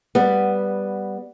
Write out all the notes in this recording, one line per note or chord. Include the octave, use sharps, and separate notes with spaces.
G3 B3